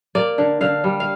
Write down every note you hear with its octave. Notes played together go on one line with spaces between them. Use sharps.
A#3 D5
D3
D3 F5
G3
F5